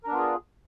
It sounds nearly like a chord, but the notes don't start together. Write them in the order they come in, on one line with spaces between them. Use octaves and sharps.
A#4 D4 B3 F4 G#4